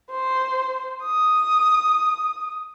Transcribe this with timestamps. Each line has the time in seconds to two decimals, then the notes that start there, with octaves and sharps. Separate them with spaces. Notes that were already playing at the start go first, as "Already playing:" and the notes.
0.11 C5
1.03 D#6